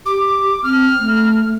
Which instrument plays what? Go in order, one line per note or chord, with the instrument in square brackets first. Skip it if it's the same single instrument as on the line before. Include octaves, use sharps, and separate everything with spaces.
[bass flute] G4 [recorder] D6
[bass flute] C4 [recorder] F6
[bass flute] A3